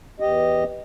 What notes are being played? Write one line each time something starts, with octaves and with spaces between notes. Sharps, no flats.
E2 G4 D#5